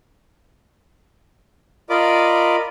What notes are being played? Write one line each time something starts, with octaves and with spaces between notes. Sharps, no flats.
F4 A#4 D5 D#5 B5 D6